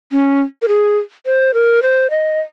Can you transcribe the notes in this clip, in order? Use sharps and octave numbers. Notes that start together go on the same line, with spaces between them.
C#4
A#4
G#4
C5
A#4
C5
D#5